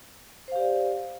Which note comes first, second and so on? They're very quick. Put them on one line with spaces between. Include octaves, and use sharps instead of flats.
C5 F5 G4 D5